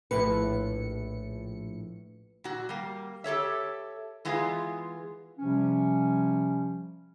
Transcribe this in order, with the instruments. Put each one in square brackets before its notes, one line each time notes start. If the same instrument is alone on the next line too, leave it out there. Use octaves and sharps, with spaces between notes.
[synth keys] A#1 A2 C#7 [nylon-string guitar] B4
[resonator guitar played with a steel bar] A#2 F#4
G3 A#3
G4 A4 C#5 E5
E3 G#3 B3 F4 G#4
[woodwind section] C3 F3 G3 C#4